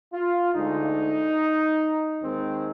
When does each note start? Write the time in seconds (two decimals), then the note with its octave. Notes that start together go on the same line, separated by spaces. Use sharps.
0.12 F4
0.53 D2 D3 G#3 D#4
2.21 D#2 D#3 G#3 C4